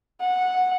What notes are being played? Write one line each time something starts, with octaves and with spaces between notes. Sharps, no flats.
F#5